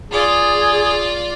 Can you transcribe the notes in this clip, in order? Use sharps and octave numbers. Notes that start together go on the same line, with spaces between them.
F4 G#4 D5